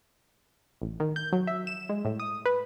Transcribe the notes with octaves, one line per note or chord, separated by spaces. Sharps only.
A1
D#3
G6
F#3
E5
E7
G#3
A2
D#6
B4